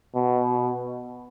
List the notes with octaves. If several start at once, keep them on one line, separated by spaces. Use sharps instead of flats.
B2